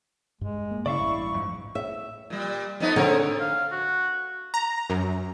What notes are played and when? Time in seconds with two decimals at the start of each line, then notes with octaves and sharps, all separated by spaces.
0.41 G2 G#3
0.71 A#3
0.86 C#3 E4 D5 E5 F5 C#6
1.00 A1 G2
1.34 F2 G#2
1.75 E5
2.30 A#2 G3
2.80 F2 B3 D#4
2.96 D3 C4 A#4 C#5
3.40 F5
3.71 F#4
4.54 A#5
4.90 F#2